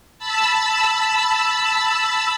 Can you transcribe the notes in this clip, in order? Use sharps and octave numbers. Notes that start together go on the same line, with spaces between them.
A5 B5 E6